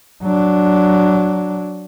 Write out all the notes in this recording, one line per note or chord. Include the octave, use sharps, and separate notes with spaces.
F#3 D4